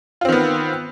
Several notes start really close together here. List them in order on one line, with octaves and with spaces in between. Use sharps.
F4 C4 D#3 B3